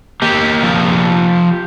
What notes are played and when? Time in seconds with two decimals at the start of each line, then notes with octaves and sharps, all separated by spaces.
0.22 A#3 G4
0.63 F3